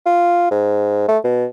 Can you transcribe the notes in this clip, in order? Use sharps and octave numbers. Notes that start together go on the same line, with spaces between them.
F4
G#2
A3
B2